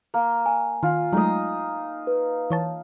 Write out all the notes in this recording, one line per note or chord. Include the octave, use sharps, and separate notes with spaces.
A#3
G#5
D#3 F4
F#3 G#3 A3 D#4 D#5
B4
E3 C#5 A5